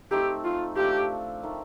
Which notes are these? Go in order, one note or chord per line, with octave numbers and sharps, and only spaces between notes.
A3 C4 D#4 G4 A4
F4
F3 A3 D4 G4
D#3 A3 D#4